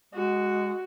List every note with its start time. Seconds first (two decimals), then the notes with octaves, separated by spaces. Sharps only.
0.14 G#3 F#4